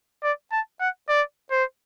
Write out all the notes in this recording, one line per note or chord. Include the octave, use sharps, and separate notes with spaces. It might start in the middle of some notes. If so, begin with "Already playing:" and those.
D5
A5
F#5
D5
C5